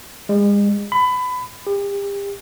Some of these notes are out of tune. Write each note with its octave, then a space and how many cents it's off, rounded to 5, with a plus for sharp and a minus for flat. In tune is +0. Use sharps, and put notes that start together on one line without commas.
G#3 -35
B5 +25
G4 +35